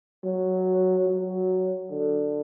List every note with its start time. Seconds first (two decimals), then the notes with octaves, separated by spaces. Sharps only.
0.25 F#3
1.07 F#3
1.91 D3